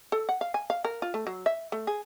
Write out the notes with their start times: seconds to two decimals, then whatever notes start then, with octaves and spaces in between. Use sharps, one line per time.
0.12 A4
0.29 F#5
0.41 F5
0.54 G#5
0.70 F5
0.85 A#4
1.02 F4
1.14 A3
1.27 F#3
1.46 E5
1.72 A3
1.87 G#4